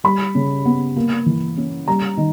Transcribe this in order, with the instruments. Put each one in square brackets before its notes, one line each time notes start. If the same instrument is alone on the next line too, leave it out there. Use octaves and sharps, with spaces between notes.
[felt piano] G3 B5
C#3
B3
A#3
E3
C#4
G3 A#5
D#3